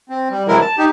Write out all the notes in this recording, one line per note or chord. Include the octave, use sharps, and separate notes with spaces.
C4
G3
C3 E3 F#3 G#3 E4 A#4
A5
D#4 G4